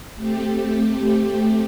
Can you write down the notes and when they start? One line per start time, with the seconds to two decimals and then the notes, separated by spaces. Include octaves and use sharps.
0.17 A3 C4 G4